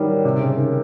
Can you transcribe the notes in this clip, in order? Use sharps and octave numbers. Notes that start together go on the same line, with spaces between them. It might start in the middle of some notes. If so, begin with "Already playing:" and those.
Already playing: D#3 F#3 G3
C3
C#3
D#3